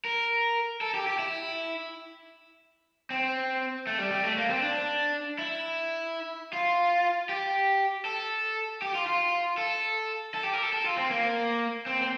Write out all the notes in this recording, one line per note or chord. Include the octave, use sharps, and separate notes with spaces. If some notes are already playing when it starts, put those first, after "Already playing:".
A#4
A4
G4
G4
E4
C4
A3
G3
G3
A3
A#3
C4
D4
E4
F4
G4
A4
G4
F4
F4
A4
A4
G4
A#4
A4
A4
F4
C4
A#3
C4
C4